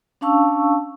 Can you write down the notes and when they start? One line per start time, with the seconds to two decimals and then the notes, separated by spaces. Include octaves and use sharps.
0.21 C#4 D4 F5 A5 C#6 E6